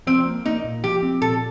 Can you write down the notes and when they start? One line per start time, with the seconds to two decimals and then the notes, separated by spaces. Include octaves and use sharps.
0.07 F3 C4
0.26 A#3
0.45 A#3 D#4
0.64 A#2
0.84 F3 G4
1.03 C4
1.22 A#2 A4